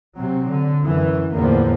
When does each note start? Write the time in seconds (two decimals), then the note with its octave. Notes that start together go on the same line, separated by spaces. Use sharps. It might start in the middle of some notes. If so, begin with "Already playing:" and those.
0.19 C3 F#3 C4
0.52 D3
0.85 F#2 E3
1.32 E2 A2 D3 F3 A#3 B3